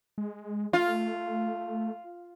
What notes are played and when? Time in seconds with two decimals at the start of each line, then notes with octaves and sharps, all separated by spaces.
0.18 G#3
0.73 A3 F4